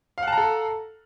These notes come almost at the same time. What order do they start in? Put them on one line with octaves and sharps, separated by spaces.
F5 F#5 A5 A#5 A4